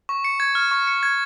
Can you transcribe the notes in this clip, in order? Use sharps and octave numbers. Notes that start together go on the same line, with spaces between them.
C#6
C#7
G#6
F6
C#6
C#7
G#6